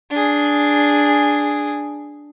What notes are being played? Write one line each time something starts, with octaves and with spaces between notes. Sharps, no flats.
D4 G#4